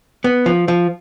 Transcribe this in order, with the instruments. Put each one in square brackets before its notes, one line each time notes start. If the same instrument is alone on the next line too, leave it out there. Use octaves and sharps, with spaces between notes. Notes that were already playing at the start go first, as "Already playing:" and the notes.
[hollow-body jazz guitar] B3
F3
F3